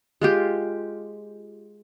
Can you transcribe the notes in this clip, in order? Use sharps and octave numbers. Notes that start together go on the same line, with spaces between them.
G#3 F4 G4